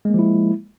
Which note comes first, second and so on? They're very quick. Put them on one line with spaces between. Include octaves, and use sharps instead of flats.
G#3 A#3 F3 E4